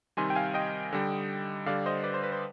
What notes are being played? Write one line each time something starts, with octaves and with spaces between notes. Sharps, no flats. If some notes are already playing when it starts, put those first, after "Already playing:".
C3 D#3 G3 G#5 C6
G5
F5 G#5
D#5 G5
D3 G3
D3 G3 D5 F5
C5 D#5
B4 D5
C5
B4
C5